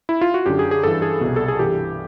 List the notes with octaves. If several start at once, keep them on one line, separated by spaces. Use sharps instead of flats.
E4
F4
F#4
F#2 D3 G4
G#4
G#4
G2 E3 A4
G#4
C2 B2
A4
G#4
G2 E3 G4